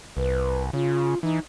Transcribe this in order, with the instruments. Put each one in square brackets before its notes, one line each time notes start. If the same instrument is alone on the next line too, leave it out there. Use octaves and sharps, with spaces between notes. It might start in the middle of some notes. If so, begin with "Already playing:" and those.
[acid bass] C2 [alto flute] B4
[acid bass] C#3 [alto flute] F4
[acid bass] E3 [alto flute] D#4